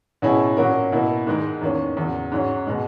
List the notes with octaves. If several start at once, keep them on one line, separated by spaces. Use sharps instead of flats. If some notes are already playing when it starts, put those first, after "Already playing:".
B2 F#3 C#4 E4 G#4
A#2 F#3 C#4 F#4 A#4
B2 A#3 E4
G#2 D#3 G#3 D#4 A#4
E2 D#3 A#3 C#4
E2 C#3 F#3
G#2 F#3 C#4
B2 G#3